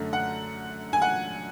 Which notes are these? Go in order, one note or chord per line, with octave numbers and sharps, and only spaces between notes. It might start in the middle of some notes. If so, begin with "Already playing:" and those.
Already playing: F#2 D3 A3
F#5
G#5
F#5